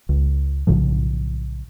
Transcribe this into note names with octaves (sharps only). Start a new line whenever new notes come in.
C#2
B1 A2 C#3 F3